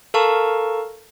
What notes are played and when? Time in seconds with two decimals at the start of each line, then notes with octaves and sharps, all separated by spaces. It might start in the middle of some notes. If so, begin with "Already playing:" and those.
0.14 A4 A#4 F5 A5 A#5 C#6